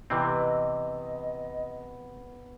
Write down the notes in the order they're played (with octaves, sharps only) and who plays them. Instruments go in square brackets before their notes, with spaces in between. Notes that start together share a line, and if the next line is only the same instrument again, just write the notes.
[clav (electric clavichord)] C3 E3 C4 [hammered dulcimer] B3 [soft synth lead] D#5